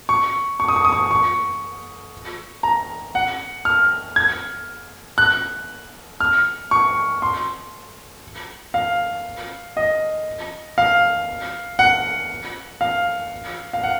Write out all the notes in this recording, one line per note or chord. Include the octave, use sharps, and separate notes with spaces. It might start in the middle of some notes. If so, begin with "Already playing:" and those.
C#6
C#6
D#6
C#6
D#6
C#6
C#6
A#5
F#5
F6
G#6
F#6
F6
C#6
C6
F5
D#5
F5
F#5
F5
F5
F#5